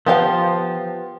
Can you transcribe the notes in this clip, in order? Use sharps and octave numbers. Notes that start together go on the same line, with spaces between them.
F3 B3 G4 F5